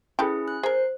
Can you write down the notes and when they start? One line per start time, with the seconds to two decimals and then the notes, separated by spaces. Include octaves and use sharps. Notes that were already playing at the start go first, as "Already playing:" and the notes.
0.19 C#4 E4 G#4 A4 B4 G5
0.48 F#6
0.63 G#4 A#4 C5